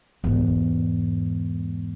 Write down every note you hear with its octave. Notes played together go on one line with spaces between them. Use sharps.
E2 G#2